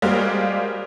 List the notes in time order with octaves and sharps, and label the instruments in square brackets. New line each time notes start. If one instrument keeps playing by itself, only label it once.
[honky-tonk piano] G3 G#3 A#3 F#4 C5 F5